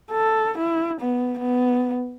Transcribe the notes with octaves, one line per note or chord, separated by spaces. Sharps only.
A4
E4
B3
B3